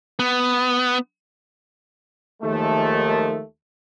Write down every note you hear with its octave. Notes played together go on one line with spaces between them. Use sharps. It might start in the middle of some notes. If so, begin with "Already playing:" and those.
B3
D#2 D#3 F3 G#3 A3